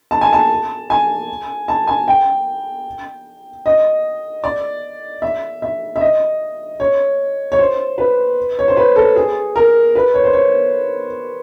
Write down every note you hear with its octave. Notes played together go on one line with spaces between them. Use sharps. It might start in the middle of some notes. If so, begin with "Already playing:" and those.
A5
G#5
A5
G#5
A5
G#5
G5
D#5
D5
E5
E5
E5
D#5
C#5
C#5
C5
B4
C#5
C5
B4
A4
G#4
A#4
B4
C#5
C5
C#5